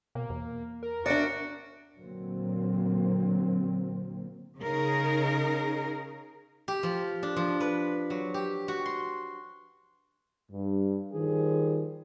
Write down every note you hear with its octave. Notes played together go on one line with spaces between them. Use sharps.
B2 A#3
E2
A#4
D4 F#4 D5
A#2 D3 F#3 A#3 C4
C#3 D#4 G#4 A#4
G4
F3
D4
F3
B4
F#3
G4
F#4
C6
G2
D#3 F3 G3 G#4